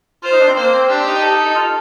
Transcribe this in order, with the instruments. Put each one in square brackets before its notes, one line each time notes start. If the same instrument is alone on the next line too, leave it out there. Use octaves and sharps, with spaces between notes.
[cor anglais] F4 [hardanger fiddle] C5
[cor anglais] D#4
D4
C4
[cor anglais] A#3 [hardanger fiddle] C5
[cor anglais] C4
[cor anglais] D4 [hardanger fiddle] G4
[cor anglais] D#4
[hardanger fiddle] A4
[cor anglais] D#4
F4